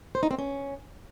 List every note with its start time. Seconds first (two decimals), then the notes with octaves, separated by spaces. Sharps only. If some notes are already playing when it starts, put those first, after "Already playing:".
0.15 C5
0.23 D#4
0.31 C4
0.39 C#4